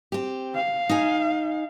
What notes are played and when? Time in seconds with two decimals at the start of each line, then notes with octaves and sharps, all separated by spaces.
0.12 C4 G4
0.55 F5
0.89 D#4 G#5